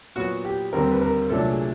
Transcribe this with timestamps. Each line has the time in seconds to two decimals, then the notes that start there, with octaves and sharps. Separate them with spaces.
0.16 A#2 F#3 B3 F#4
0.45 G4
0.73 D#2 D3 G3 C4 A#4
0.92 B4
1.02 A#4
1.30 C2 A#2 F#3 A3 D4 A4
1.49 G#4